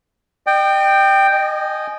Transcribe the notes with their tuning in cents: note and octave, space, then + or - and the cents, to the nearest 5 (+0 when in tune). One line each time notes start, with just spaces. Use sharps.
D#5 -45 G5 +0
D#5 -15 G#5 +15